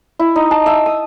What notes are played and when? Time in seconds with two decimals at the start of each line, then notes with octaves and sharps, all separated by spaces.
0.19 E4
0.36 D#4
0.51 A5
0.66 E5
0.86 D#6